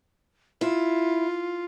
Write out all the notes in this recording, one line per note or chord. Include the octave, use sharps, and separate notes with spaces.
E4 F4